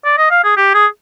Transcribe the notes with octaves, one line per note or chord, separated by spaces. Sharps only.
D5
D#5
F5
G#4
G4
G#4